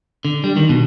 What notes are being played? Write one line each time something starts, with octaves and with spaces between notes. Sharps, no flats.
D3
G3
D#3
B2